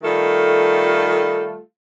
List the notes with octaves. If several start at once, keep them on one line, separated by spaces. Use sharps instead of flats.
D#3 G3 A3 F4 A4